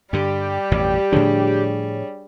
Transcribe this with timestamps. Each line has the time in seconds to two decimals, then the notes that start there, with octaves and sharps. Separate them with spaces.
0.13 G2 D3 G3 G4
0.72 A1 F2 B2
1.12 A2 D3 F3 D4 G#4 C#5